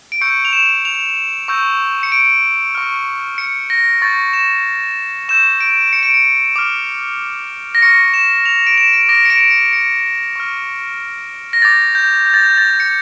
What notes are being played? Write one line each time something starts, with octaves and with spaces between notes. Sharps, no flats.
D7
C#6 E6 G6 C#7
F7
E7
F7
C#6 E6 G6
C#7
D7
C#6 F6
C#7
A#6
C#6 G6 A6
E7
C#6 E6 G6 E7
D7
C#7
D7
C#7
D6 F6
A#6
C#6 F6 C#7
E7
F7
D7
E7
D7
D6 F6 A#6
C#7
D7
C#7
C#7
C#6 F6
A#6
D6 G6 A6
G6
G6
A6
G6
A6
C#7